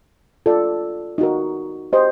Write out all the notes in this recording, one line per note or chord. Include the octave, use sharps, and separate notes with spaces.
F4 A4 D5
D#4 F#4 A#4
G4 C5 D#5